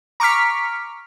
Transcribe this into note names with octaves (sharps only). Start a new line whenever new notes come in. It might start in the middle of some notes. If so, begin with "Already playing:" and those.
A#5 C#6 D6 F6 B6